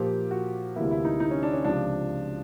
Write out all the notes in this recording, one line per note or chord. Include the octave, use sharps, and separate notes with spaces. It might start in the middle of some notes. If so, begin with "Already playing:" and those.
Already playing: A#2 F3 A#3 G4
F#4
D2 C3 E3 G3 A#3 E4
E4
D#4
D#4
C#4
D4
C#4
C#2 C3 F3 D4